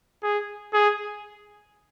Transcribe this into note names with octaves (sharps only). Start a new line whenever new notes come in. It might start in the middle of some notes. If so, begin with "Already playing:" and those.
G#4
G#4